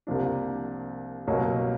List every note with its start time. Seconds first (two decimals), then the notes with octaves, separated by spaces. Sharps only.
0.07 C2 C3 F3 A#3 D4
1.27 C2 B2 F#3 A#3 C#4